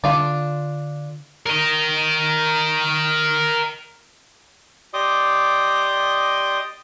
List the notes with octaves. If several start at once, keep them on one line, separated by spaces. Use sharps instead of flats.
D3 D4 F4 D5
A#4 D#5
G4 D5 D#5 C6 D6 D#6